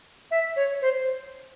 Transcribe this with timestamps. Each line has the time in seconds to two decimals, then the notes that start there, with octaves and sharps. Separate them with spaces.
0.31 E5
0.56 C#5
0.82 C5